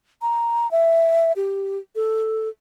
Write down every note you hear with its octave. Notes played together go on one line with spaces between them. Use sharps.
A#5
E5
G4
A4